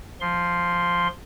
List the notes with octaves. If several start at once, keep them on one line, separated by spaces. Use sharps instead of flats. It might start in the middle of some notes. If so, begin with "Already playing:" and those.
F3 C6